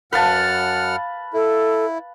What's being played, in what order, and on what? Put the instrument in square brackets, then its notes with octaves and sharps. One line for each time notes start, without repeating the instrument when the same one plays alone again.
[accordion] F#2 F#5 F6 [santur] B4 F5 A5
[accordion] E4 [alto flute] A4